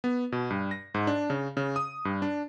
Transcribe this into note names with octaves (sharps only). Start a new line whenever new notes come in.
B3
B2
G2
A#6
G#2
D4
C#3
C#3
D#6
G2
D4